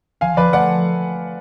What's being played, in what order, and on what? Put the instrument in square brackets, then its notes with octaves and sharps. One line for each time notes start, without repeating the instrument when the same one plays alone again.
[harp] F3 [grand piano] F5 G#5
[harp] F3 [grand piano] B4 D5
[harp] A3 [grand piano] D5 F#5